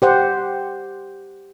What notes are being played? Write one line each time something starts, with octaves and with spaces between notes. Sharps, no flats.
G4 C5 F#5